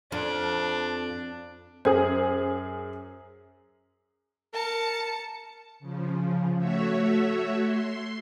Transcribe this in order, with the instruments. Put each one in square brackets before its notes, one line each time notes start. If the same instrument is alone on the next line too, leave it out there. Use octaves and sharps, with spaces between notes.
[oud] F2 [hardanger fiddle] D4
[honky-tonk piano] F#2 G#4 [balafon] C5
[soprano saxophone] A#4 [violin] A5 C#7
[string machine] C#3 F3
A3 F#4 C#5 E5
C6